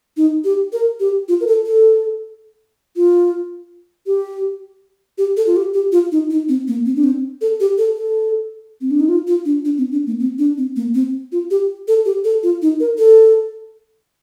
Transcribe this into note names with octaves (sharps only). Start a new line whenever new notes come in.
D#4
G4
A#4
G4
F4
A#4
A4
A4
F4
G4
G4
A4
F4
G4
G4
F4
D#4
D#4
C4
A#3
C4
D4
C4
A4
G4
A4
A4
C4
D4
D#4
F4
F4
D4
D4
C4
D4
A#3
C4
D4
C4
A#3
C4
F4
G4
A4
G4
A4
F4
D#4
A#4
A4